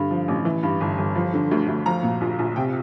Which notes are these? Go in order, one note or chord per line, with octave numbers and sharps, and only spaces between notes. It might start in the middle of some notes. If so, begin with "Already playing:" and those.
Already playing: G2 D3
F3
A1
E3
G2
G1
G1
F3
D3
D2
D2
F3 A#5
A#2
A#1
A#1
C3 G5